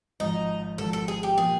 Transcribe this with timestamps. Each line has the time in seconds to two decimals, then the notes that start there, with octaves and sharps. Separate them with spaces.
0.20 G#1 G#2 F3 D#4
0.78 G#1 G#2 F3 A4
0.93 A4
1.08 G#4
1.23 G4
1.37 A#2 F3 A#3 G#4